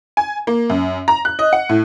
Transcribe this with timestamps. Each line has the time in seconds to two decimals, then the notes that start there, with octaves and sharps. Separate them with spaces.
0.17 G#5
0.47 A#3
0.70 F#2
1.08 A#5
1.25 F#6
1.39 D#5
1.53 F#5
1.69 A2